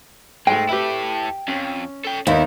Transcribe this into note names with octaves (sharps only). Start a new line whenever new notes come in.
G#2 G#3 A3 G5
E4 G4 A4 B4 E5
F2 C#4
A4 G5
D#2 B3 D#4 E4 E5